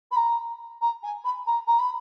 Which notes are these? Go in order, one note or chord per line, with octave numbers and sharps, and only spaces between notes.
B5
A#5
A#5
G#5
B5
A#5
A#5
B5